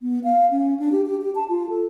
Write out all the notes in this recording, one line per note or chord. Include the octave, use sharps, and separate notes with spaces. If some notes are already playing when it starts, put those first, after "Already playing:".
B3
F5
C#4
D4
G4
G4
G4
A5
F4
A4